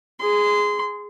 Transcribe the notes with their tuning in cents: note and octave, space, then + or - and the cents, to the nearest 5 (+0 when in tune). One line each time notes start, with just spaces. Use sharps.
G#4 +0 C6 -25